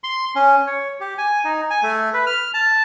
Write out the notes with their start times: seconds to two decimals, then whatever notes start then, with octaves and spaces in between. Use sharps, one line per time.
0.04 C6
0.35 C#4
0.67 C#5
1.00 G4
1.18 G#5
1.45 D#4
1.70 G#5
1.83 A3
2.13 B4
2.27 F6
2.54 A5